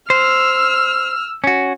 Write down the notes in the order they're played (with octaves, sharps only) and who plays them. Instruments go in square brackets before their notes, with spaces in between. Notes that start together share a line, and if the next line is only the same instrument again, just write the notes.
[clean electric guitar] C5 [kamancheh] E6 F6
[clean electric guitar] C#4 F#4